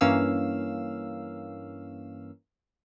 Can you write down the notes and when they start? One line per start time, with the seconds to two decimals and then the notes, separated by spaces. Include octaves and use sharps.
0.01 G2 E3 A#3 C#4 F5 E6